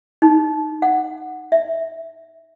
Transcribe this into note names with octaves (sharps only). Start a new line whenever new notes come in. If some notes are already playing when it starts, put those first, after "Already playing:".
D#4
F#5
E5